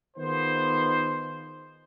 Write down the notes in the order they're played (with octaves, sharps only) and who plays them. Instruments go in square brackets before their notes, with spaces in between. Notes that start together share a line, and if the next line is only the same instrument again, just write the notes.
[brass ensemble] D#3 B3 D#4 F4 G#4 C5